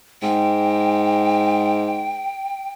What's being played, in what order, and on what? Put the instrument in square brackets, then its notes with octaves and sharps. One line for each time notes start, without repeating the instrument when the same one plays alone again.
[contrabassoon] G#2 [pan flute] G5